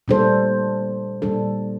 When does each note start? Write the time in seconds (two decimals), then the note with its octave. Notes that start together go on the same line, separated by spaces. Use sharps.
0.08 A#2 G3 D4 A4 C5
1.22 A#2 G3 D4 A4